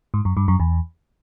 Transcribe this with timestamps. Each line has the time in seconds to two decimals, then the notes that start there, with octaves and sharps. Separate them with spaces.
0.14 G#2
0.25 F#2
0.37 G2
0.48 F#2
0.60 E2